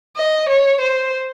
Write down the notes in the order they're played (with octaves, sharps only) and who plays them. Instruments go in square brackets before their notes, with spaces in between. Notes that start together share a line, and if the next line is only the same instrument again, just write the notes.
[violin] D#5
C#5
C5